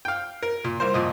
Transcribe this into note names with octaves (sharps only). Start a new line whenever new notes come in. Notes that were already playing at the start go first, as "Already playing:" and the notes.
F5 G5
A#4
A#2
C2 A#4 C5
F2 A#2 D#5